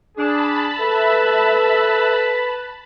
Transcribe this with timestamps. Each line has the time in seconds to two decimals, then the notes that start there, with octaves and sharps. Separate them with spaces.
0.17 D4 G#4 A5 B5
0.80 A4 B4 E5